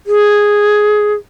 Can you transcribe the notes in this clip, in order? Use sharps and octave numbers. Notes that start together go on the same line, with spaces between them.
G#4